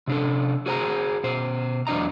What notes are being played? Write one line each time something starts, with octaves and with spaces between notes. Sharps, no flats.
C3 D4 A4
F#4 G#4 C5 G5 A#5
B2 C5
E2 F#3 D4 D#5 A#5